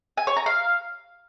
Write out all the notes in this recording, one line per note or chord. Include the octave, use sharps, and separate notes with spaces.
G#5
C#5
A#5
F5